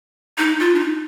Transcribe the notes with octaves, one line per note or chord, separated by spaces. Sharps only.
D#4
F4
D4
D#4